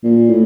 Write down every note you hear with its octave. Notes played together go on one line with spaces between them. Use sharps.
A#2
A2